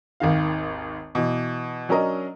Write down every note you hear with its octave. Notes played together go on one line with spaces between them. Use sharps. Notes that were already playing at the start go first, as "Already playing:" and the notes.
G#1 D#2 D#3 F5
B2 E3
F#3 C#4 D4 A#4 D#5